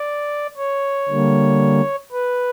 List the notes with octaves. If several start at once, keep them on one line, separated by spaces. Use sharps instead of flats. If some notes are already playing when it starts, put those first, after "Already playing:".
Already playing: D5
C#5
D3 G3 A#3
B4